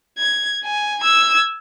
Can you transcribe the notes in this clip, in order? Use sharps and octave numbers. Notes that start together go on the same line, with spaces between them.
G#6
G#5
E6 G#6